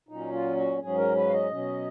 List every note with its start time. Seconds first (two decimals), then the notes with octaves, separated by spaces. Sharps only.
0.09 A#2 F#3 C#4 D#4
0.32 F4
0.56 F#4
0.79 G#2 F#3 C#4 G#4
0.97 A#4
1.16 B4
1.29 F5
1.34 D#5
1.51 B2 F#3 C#4